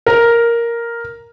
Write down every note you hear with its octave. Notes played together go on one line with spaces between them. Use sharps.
A#4